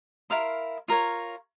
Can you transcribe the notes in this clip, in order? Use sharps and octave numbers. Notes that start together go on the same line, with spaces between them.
E4 A#4 F5 C6
F4 A#4 C#5